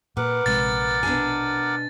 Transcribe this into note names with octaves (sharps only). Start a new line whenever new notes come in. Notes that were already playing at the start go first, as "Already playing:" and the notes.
A#2 A#4 B4 F#5 D6
A#1 C3 G#3 A6
B2 D4 G#5